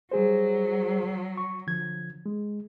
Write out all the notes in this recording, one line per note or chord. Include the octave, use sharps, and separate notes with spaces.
F#3 G3 G#4 C5
C#6
D3 F3 G#6
G#3